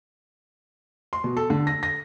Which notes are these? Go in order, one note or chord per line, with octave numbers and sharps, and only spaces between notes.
C6
B2
A4
D3
A#6
A#6